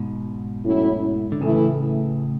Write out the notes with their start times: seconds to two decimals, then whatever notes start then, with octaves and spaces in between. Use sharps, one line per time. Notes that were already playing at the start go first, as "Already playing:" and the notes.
Already playing: G#2 B2
0.65 A2 F#3 C#4 E4
1.32 D3
1.41 A2 C#3 E3 A3 E4